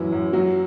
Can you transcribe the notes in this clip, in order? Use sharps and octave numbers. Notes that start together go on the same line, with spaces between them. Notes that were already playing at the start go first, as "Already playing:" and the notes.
Already playing: F#2 A2 E3 F#3 E4
F#2
F#3 F#4